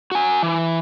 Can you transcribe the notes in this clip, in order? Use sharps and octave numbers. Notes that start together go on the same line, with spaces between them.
F#4 G#5
E3